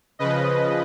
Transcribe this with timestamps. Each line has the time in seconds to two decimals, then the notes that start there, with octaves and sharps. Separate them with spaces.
0.19 C#3 F3 B4 D#5